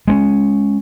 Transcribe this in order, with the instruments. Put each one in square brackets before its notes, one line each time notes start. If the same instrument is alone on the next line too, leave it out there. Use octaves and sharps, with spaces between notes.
[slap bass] G#3 B3 C#4